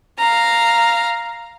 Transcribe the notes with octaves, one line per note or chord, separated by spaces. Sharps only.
F5 A#5